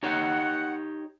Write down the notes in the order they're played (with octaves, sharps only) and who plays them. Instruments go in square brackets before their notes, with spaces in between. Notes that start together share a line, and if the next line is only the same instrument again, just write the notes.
[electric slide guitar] D#4 G4 C#5 [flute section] F#5